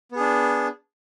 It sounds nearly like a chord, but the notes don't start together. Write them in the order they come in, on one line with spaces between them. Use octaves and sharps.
B3 G#4 D4